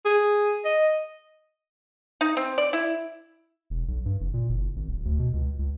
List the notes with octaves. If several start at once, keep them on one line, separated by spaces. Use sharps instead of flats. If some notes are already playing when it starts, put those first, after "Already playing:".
G#4
D#5
D#4
C4
D5
E4
E1
B1
G2
F#1
A#2
F#1
G#1
D1
D2
B2
C#2
C#2